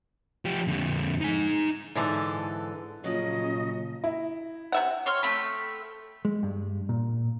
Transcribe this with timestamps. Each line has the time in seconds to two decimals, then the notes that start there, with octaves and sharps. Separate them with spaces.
0.45 F3 G4
0.68 F2 D3
1.21 D#4 G#5
1.95 G#2 D3 E3 A4
3.04 A#2 C#3 F3 F#3 D#5
4.04 E4
4.72 C3 E5 F#5
5.06 C#5 C6 F6
5.23 A3 C4 B5
6.25 G#3
6.43 G2
6.89 A#2